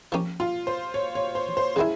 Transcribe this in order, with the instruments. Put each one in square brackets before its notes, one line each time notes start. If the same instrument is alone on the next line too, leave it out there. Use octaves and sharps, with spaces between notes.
[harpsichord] F3 A#3 C#4 G4
[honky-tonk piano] F4
C5
C#5
C#5
C5
C5
[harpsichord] C#3 G3 A#3 E4 [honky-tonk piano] G#4